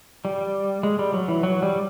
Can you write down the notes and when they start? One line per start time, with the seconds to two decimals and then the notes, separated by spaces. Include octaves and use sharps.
0.25 G3
0.83 G#3
0.99 G3
1.13 F#3
1.28 E3
1.43 F#3
1.62 G3